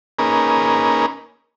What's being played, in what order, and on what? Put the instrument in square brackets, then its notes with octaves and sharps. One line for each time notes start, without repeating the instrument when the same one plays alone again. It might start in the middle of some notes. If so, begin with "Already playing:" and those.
[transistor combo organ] A#3 C#4 D#4 G#4 A#4 B4